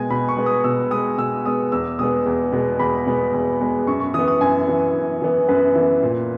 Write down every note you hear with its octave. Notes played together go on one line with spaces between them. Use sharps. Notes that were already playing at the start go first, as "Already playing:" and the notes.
Already playing: B2 G#3 B3 G#5
B2 B5
C#6
G#3 B3
D#6
B2 E6
G#3 B3 D#6
B2 E6
G#3 B3 D#6
E2 E6
B2 G#3 B3 D#6
E2
B2 G#3 B3
E2 B5
B2 G#3 B3
E2
B2 G#3 B3
F#2 C#6
C#6
E3 B3 D#6
D#6
F#2 G#5
E3 B3
F#2
E3 B3
F#2 B4
E3 B3
A#2